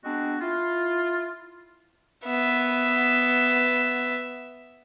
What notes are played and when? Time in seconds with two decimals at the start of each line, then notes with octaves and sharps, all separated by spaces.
0.04 G#3 B3 C4 D4 F#4
0.41 E4 F4
2.25 B3 E5